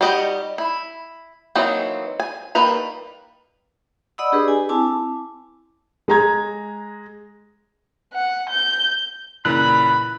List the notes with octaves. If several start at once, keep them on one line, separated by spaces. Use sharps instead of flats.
G3 D#4 F#4 G4 D#5
E4
E3 F#3 A#3 C4 D#4
G#5
D#3 G3 A#3 B4 A#5
D5 D#5 F#5 B5 D#6 E6
D4 G4 G#4 B4
G#5
C4 E4 G#5 A5 D6
G#3 A#5 G#6
F#5
G6
A#2 C#3 E3 B5 F#6